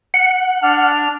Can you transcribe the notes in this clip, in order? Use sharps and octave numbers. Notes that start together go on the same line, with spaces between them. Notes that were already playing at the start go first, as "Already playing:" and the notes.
F#5
D4 F6